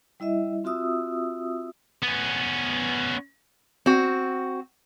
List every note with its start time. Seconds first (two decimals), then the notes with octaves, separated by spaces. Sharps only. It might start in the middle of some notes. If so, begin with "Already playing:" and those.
0.20 G3 E4 D#5 E5
0.64 C4 F4 F#4 E5 D#6 E6
2.03 B3 C#4
3.86 C4 F#4